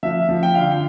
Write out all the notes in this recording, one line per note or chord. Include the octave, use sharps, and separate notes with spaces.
F3 E5
F3
G5
D3 F5
G5